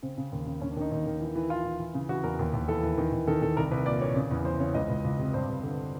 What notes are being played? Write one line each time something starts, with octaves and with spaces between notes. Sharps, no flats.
C#3 C4
C#3
D#2
C#3
D#2 C#4
D4
D#3 D#4
D#2 D#4
D#3
E3
E3
E3 F4
E3
E3
C#3
E3 F#4
E2 A#4
D#2
D#2
E3 A4
E3
D#3
D#3
D#3 A4
D#3 A4
C2 A#4
C2 B4
A#2 D5
A#2 C#5
C#3
E2
E3 C5
C#3 C#5
C#2 D#5
C#2
C#2
C3
G2 C5
G2
D3